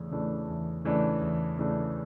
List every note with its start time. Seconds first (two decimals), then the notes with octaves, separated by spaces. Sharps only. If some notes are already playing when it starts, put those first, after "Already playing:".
Already playing: E2 C#3 E3 A3 D4
0.11 C#3 E3 A3 D4
0.48 E2
0.85 C#3 E3 A3 D4
1.21 E2
1.58 C#3 E3 A3 D4